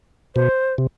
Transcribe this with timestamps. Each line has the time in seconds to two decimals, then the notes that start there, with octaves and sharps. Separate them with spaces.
0.35 B2 C5
0.78 C3